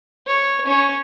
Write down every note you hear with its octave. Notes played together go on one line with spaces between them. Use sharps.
C#5
C#4 C#5